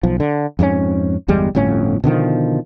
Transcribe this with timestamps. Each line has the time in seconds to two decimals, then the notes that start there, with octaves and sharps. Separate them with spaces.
0.03 B1 F3
0.20 D3
0.59 F2 G#2 G3 C#4
1.28 G1 E2 G3 G#3
1.55 G1 F2 A2 C#4
2.04 B2 D3 D#3 F3